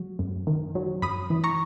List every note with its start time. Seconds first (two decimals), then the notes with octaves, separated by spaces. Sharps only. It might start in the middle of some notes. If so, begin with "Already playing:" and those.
Already playing: F#3
0.19 F#2
0.47 D#3
0.75 F#3
1.02 F#2 B5 D#6
1.30 E3
1.44 A#5 C#6